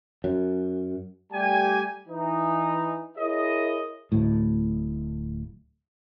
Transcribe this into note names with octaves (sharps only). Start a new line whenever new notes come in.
F#2
G3 A3 G4 G#5
E3 D#4
E4 G#4 A#4 C#5 D#5
D1 A2